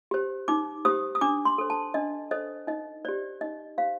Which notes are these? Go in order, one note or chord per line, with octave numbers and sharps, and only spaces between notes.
G4 C5
D#4 D6
G4 C5 D#6
D#6
D4 D6
C6
A4 C5
A5
D4 D#5
A4 C5 D#5
D#4 D#5
G4 C5 D5
D#4 D#5
G4 C5 F5